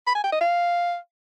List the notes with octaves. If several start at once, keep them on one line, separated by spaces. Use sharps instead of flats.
B5
G#5
G5
D#5
F5